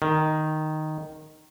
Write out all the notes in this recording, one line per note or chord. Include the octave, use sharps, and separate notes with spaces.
D#3